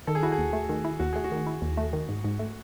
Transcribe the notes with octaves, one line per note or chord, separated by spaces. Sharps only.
D#3 A4
G#4
E4 F#4
G#4
D#2
A3
D#3
E4
D#2 F#4
A3 G#4
F#4
D#3
E4
D#2
A3
D#3
G#2
G#2
A3